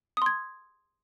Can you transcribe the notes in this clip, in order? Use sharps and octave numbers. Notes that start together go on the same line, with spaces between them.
C6 D#6 G#6